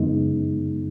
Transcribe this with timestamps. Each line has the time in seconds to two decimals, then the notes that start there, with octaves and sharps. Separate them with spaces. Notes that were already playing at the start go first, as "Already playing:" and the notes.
Already playing: F#2 C#3 G#3 B3 D#4